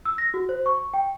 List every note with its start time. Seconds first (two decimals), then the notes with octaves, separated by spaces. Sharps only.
0.05 E6
0.18 A#6
0.34 F#4
0.49 C5
0.66 C#6
0.94 G5